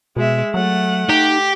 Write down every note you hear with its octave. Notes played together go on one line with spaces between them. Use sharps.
B2 G#3 E5
F#3 A3 F#5
D#4 G4